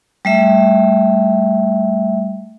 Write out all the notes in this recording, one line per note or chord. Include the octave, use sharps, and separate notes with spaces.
G3 A3 E5